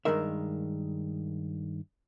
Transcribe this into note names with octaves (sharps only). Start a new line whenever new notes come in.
G2 B2 D#3 G#3 A#4 E5